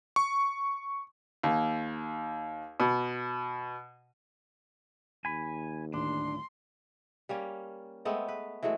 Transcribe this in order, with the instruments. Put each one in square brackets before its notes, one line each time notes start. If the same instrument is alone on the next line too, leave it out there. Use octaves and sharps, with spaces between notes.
[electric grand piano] C#6
[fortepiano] D#2
B2
[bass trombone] D#2 [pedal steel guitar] G#5 B5
[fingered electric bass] D2 A2 D#3 [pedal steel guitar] D4 [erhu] C6
[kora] G3 A#3 C#4
G#3 A3 B3 C4
B4
E3 F#3 G#3 A3